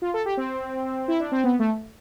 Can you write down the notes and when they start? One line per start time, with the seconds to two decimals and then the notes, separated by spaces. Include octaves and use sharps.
0.02 F4
0.14 A4
0.25 G4
0.37 C4
1.08 E4
1.20 D4
1.32 C4
1.44 B3
1.59 A3